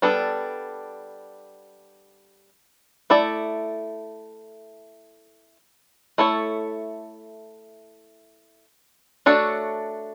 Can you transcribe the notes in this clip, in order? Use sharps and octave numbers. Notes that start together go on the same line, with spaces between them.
G3 B3 D4 A4
A3 E4 A4 D5
A3 E4 A4 C#5
A3 D4 F#4 A4 C#5